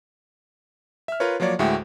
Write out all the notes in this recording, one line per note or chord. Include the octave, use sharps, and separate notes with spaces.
E5 F6
F4 A#4 B4 C#5
F3 F#3 A#3 C#5 D5
D2 A2 G#3 F#4 E5 G5